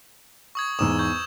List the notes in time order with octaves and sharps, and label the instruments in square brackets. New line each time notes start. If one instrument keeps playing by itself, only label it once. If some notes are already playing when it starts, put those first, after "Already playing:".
[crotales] C#6 D#6 G#6
[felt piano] E2 G#2 D#6 [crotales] E6 E7
[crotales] C#6 G6